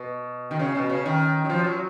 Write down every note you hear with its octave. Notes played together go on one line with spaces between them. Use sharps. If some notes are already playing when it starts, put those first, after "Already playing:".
Already playing: B2
D#3
C#3
B2
C#3
D#3
F#3
F3
F#3